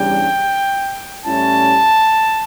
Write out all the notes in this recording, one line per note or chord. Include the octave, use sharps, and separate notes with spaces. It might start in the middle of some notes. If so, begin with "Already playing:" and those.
Already playing: E2 C#3 G3 D4 G5
A2 G3 C#4 E4 A5